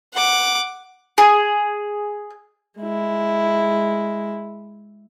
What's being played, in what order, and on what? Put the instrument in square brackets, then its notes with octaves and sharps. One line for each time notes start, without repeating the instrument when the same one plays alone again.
[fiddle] F#5 D6
[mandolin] G#4
[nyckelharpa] G#3 E4